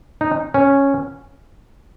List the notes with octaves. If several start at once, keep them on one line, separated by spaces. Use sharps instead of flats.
D#4
C#4